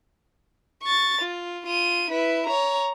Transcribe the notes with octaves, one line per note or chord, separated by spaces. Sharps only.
C#6 A6
F4
F4 D#7
E4 B4
C#5 A#5